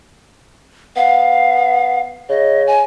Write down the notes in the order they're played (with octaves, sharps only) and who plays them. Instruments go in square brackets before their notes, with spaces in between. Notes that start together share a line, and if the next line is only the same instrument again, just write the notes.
[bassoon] B3 [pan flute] F5
[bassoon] C#3 [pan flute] D#5
[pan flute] G#5